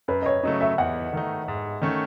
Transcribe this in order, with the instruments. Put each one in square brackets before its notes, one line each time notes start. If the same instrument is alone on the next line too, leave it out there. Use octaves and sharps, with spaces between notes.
[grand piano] F#2 [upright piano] B4
[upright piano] D#5
C#5
[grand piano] C#3 F#3 A3 [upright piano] D#5
[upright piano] E5
[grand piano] E2 [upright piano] F#5
[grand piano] D#3 A3 D#4
G#2
D#3 A3 C#4